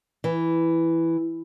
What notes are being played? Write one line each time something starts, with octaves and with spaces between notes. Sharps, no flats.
E3